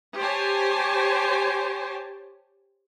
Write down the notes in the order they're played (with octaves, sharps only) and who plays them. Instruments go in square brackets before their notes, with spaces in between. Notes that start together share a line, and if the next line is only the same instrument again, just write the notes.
[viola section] G4 C5 C#5 G#5 A5